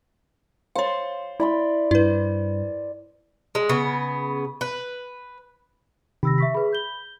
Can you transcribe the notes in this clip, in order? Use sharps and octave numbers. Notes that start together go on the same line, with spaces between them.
C5 C#5 F5 C6
E4 D5 B5 C6
G2 E4 B4
G#3
C#3 B3
B4
C3 D#3 G4 B5 E6 A#6
E5 C#6 B6
G#4 B4 B5
G6 G7